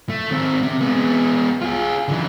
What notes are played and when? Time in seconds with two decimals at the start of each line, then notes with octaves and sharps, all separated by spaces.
0.09 A3
0.30 D#3 C4
0.63 C3
0.81 G#3 B3
1.62 F4 G#4
2.08 D3 E3